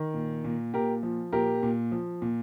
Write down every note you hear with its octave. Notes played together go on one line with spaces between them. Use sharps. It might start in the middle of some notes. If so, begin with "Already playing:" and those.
Already playing: D#3
A#2
A#2
A#2 G4 A#4
F3
A#2 G4 A#4
A#2
F3
A#2